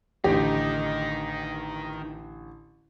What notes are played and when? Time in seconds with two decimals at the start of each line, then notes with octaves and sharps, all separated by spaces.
0.24 A1 D3 D#3 D#4 G4